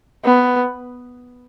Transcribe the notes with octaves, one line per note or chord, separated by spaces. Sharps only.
B3